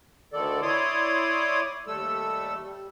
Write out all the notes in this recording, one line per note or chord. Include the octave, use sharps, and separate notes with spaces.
D2 D3 D#3 A4 D5
E4 C#5 D5 C6 D6 D#6
D#2 G3 A3 A4 E6
G3